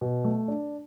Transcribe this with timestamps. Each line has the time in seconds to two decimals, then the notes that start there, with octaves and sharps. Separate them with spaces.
0.01 B2
0.24 A3
0.48 D4